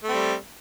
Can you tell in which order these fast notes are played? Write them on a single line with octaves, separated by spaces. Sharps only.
A3 C4 G3